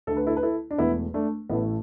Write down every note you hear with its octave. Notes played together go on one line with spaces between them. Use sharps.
D2 D3 A3 A4
B4
E4 A4
B4
E4 A4
D4
E1 E2 E3 A3 B3 E4
A3 D4
A1 A2 A3 B3